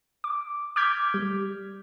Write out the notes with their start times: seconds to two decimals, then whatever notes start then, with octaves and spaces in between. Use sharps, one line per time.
0.24 D6
0.76 D6 F6 G6 G#6 B6
1.14 G3